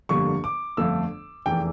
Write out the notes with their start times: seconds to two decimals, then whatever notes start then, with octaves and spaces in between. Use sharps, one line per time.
0.09 G1 F2 D3 G3 A#3 C#6
0.44 D6
0.77 G1 F2 D3 A3 E6
1.46 F1 E2 E3 G5